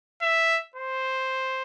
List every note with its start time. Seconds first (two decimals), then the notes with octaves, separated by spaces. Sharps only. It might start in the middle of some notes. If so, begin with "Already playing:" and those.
0.22 E5
0.76 C5